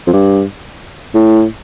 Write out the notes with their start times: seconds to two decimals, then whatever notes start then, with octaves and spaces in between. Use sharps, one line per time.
0.07 F2
0.13 G2
1.15 A2